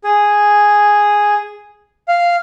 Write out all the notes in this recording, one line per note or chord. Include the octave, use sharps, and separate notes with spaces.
G#4
F5